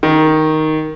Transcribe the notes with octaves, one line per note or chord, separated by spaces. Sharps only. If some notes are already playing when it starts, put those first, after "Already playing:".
D#3